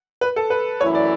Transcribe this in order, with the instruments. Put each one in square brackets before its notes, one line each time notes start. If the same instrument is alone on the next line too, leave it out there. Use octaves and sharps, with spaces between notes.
[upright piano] B4
A4
B4
[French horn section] F#2 E3 A3 E4 [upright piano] C#5
[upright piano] D5